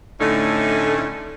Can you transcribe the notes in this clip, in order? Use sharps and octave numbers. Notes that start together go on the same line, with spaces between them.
A2 D3 A3 C#4 D#4 E4